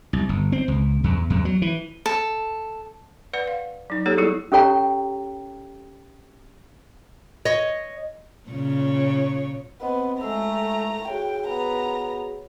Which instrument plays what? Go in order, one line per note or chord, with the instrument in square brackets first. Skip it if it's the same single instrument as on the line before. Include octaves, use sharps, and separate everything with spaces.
[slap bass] C2
G1
C4
C#2
E2
E2
F#3
E3
[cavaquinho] A4
[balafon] B4 D5 F#5
F5
F#3 D#4
A#3 D#4 G4 A4 C#5
F#3 G3 B3 E4 G#4 A4
[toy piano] C#4 G4 A4 C#5 G5 A#5
[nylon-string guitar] C#5 D#5
[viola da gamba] A#2 C#3 C#5
[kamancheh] B3 [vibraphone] C4 C5 D#5
[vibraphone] G#3 E6 [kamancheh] A3 A#5
[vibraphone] F#4 G#4 C#5 [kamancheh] G5
[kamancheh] B3 A#5